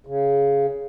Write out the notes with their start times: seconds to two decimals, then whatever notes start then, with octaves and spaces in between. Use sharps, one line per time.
0.07 C#3